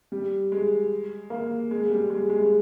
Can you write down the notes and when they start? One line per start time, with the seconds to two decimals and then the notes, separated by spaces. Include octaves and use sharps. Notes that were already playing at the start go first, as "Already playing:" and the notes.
0.12 G3
0.52 G#3
1.30 A#3
1.71 G#3
1.90 G3
2.10 G#3
2.30 G#3
2.40 G#3